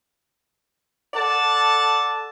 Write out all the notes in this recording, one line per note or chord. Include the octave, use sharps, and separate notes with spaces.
A4 D5 F#5 A5